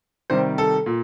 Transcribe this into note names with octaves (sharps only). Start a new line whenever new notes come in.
C3 D#3 G3 C5
A4
A#2